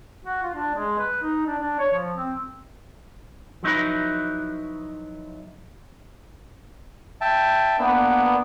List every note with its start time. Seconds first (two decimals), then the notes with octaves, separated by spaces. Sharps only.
0.25 F#4
0.42 F4
0.55 D4
0.74 G#3
0.98 B4
1.22 D#4
1.47 D4
1.59 D4
1.79 C#5
1.94 F3
2.16 C4
3.63 F3 F#3 D#4 E4 B4
7.21 E5 G5 A5
7.79 A#3 B3 D4